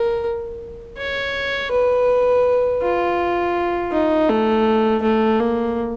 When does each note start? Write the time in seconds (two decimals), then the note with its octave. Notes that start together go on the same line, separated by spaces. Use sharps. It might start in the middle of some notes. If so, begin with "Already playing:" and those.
Already playing: A#4
0.97 C#5
1.71 B4
2.82 F4
3.92 D#4
4.29 A3
5.02 A3
5.40 A#3